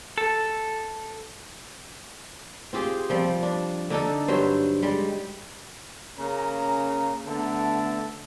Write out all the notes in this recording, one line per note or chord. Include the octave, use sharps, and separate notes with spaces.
A4
C4 F4 G4 G#4
F3 G3 C4
D4
D3 D4 D#4 A4
G2 F#3 C5
G3 G#3
C#3 A#3 C#4 A#5
D3 A3 B3 A4 E5 A5